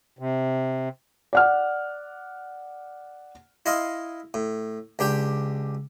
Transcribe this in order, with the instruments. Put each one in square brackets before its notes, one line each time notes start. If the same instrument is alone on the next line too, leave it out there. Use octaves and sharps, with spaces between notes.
[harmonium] C3
[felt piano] D5 F#5 F6
[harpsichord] E4 D#5 F5 C6
A2
C#2 D4 G4 G5